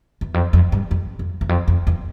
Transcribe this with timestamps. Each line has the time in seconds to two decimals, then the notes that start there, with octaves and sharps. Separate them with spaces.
0.21 E2
0.34 F2
0.53 F2
0.72 G2
0.91 F2
1.19 F2
1.41 E2
1.49 F2
1.68 F2
1.87 E2